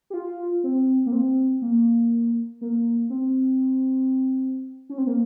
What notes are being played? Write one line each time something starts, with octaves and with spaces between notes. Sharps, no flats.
G4
F4
C4
A#3
C4
A#3
A#3
C4
C#4
C4
A#3